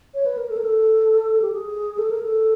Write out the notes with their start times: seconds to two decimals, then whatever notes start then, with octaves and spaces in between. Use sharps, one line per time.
0.15 C#5
0.26 B4
0.37 A#4
0.49 A4
0.57 A#4
0.64 A4
1.42 G4
1.52 G#4
1.98 A4
2.11 A#4
2.23 A4